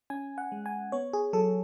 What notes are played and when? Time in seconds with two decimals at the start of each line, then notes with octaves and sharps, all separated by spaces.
0.10 C#4 G#5
0.38 F#5
0.52 G#3
0.66 G#5
0.92 B3 C#5
1.13 G#4
1.33 F#3 A4